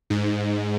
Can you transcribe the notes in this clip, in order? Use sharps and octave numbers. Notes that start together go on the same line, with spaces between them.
G#2